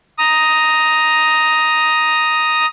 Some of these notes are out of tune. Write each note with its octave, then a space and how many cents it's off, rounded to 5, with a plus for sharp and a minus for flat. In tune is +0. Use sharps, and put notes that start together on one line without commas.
A#5 +0 D#6 +5